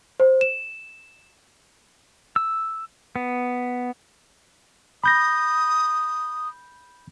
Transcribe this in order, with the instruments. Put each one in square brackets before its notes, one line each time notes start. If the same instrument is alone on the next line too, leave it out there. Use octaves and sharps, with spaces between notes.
[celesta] C5
E7
[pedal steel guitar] E6
B3
[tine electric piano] B5 G6 A#6 [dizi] D#6